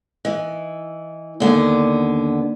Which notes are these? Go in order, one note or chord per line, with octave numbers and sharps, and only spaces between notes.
E3 D#5
D#2 D3 A#3 B3 D5 F#5